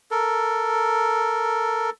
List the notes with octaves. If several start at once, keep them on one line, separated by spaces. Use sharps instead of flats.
A4 A#4